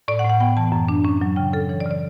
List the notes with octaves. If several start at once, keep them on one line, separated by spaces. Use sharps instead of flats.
A2 D5
F#5
A2
F#5
B3 G5
E3 A5
F#2
D4
C#4
F#3
C#3 G5
C#3 A4
E3 C#5
D5
C#3
D5